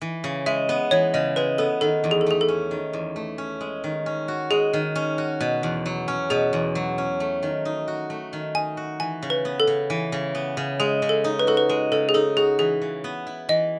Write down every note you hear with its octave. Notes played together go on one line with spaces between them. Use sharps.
E3
C#3
G#3 E5
B3
E3 C#5
C#3 D#5
G#3 B4
B3 A4
D#3 A4
E2
G#4
A4
A3 G#4
A4
C#4
D#3
E2
A3
C#4
G#3
D#3
C#4
F#4
G#3 G#4
D#3
C#4
F#4
B2
E2
F#3
C#4
B2 G#4
E2
F#3
C#4
A3
D#3
D#4
F#4
A3
D#3
D#4 G#5
F#4
E3 G#5
C#3
B4
B3
A4
C#3
E3
C#3
B3
C#3
G#3 G#4
C#3
A4
D#4
B4
F#4 A4
B4
G#3 B4
C#3 A4
G#4
D#4 A4
F#4 G#4
E3 G#4
C#3
B3
E4
E3 D#5